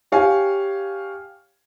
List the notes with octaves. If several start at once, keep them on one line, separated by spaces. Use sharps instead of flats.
G4 C#5 F5 G#5